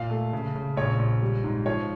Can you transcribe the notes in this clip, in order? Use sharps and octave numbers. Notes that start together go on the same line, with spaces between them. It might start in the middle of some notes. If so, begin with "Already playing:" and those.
Already playing: A#2 F5
A3
C#3
C#3
A#1 C#5
A#1
G3
G#2
F3 C#5